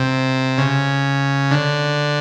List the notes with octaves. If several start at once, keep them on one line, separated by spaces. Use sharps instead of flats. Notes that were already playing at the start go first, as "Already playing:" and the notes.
Already playing: C3
C#3
D3